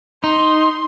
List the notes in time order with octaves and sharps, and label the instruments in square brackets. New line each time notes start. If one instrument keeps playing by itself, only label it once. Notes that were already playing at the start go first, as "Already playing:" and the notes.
[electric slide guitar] D#4 [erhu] C6